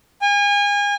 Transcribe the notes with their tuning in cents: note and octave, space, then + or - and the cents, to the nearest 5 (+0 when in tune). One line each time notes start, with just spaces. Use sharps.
G#5 -35